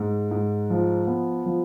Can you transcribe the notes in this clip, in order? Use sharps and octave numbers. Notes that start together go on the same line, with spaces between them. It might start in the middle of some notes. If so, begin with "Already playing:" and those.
Already playing: G#2
G#2
F3
B3
F3